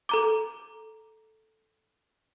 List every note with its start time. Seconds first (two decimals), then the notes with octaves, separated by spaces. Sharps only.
0.09 A4 A#5 D6